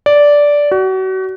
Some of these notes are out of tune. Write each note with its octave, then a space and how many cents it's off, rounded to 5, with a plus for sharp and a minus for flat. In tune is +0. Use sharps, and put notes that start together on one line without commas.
D5 -10
F#4 +35